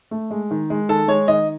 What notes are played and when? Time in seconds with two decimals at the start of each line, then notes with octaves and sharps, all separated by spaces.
0.11 A3
0.31 G#3
0.51 D#3
0.70 G#3
0.89 D#3 A4
1.08 G#3 C#5
1.28 D#3 D#5